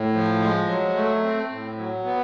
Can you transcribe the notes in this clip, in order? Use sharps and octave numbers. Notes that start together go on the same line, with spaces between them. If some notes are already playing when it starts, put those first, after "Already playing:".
Already playing: A2
F3
G#3
F#3
A3
C4
A2
F#3
B3